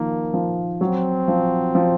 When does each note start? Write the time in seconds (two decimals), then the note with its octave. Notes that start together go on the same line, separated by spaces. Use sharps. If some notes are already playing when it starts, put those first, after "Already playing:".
Already playing: D#3 F3 A#3
0.34 F3
0.81 F#3 C4
1.28 F3
1.75 F3